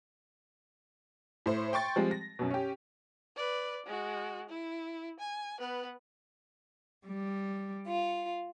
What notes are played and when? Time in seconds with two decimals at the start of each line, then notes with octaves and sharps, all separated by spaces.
1.46 A2 C5
1.73 G5 C6 C#6 A6
1.96 F3 G3 G#3 C4
2.11 A#6
2.39 F#2 B2
2.50 C#4 G4
3.36 B4 D5
3.86 G#3 F#4
4.49 E4
5.20 G#5
5.60 B3 B4
7.06 G3
7.86 F4